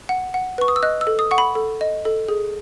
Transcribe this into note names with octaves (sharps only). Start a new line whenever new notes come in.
F#5
F#5
B4 C#6
D#6
E6
D#5 F#6
E6
A4
D#6
F#5 C#6
B5
A4
D#5
A4
G#4